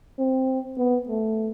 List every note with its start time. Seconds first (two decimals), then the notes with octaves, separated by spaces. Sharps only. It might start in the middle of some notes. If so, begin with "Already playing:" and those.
0.19 C4
0.78 B3
1.09 A3